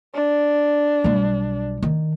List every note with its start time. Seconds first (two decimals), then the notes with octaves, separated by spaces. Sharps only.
0.14 D4
1.04 B1 G3
1.83 D#3